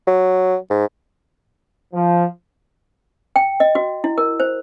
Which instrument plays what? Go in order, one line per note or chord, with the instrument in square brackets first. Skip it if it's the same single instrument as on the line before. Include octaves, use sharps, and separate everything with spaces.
[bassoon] F#3
G#2
[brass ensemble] F3
[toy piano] G5
D#5
F#4
E4
A#4
C5